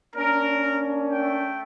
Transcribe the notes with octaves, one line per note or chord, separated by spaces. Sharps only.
A#3 C#4 D4 A#4
A3 G5